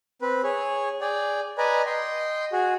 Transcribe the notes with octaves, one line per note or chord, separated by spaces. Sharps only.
C4 B4
G#4 C#5
G#4 D5 G5
B4 D5 D#5 G#5 A#5
D#5 G5 C6
F#4 G#4